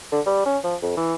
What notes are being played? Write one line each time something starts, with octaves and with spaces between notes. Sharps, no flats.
D3
G3
C#4
F3
F2
E3